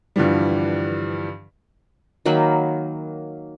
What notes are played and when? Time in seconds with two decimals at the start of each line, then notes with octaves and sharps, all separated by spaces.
0.16 G2 D3 E3 F3 G3
2.25 D#3 F#3 A#3 B5